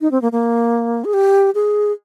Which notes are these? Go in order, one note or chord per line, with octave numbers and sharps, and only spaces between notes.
D#4
C4
A#3
A#3
G#4
G4
G#4